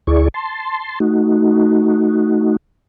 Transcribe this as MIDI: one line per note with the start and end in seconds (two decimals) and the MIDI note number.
0.07 0.28 38
0.07 0.28 64
0.07 0.28 68
0.07 0.28 74
0.07 0.28 85
0.34 0.99 81
0.34 0.99 84
1.00 2.56 57
1.00 2.56 63
1.00 2.56 66